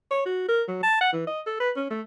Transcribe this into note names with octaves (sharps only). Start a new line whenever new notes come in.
C#5
F#4
A#4
F#3
A5
F#5
E3
D#5
A4
B4
C#4
A3